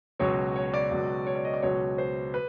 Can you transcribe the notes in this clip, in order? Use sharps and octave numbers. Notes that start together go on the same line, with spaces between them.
C#2 B2 F#3 C#5
C#5
D5
C#2 B2 F#3
C#5
D5
D#5
D5
C#2 B2 F#3 C#5
C5
B4